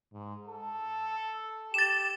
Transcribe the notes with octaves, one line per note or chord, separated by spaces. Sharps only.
G#2
A4
G4 A6 E7